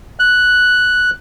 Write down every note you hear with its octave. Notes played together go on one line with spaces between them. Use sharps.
F#6